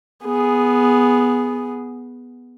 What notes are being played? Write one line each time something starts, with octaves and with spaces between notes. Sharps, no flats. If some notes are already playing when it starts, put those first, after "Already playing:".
B3 G#4